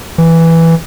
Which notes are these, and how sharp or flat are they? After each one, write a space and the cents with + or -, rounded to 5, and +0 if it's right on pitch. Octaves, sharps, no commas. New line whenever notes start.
E3 +0